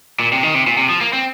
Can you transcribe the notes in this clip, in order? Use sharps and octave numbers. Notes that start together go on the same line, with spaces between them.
A#2
C3
D#3
C3
A#2
C3
F3
A#3
C4